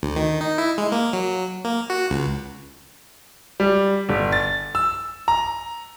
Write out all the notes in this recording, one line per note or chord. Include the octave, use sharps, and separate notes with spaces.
D2
D#3
D#4
E4
G#3
A#3
F#3
A#3
F#4
C#2
G3
G1
A6
E6
A#5